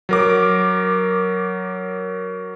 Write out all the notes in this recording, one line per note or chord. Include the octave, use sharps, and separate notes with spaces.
F#3 A#4 D6